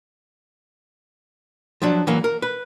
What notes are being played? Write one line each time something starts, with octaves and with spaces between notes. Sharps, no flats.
F3 F#3 D4
E3 F#3 A#3
A#4
B4